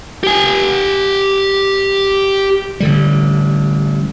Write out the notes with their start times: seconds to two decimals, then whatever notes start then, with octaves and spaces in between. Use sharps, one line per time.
0.24 G4 G#5
2.80 A1 D3 G3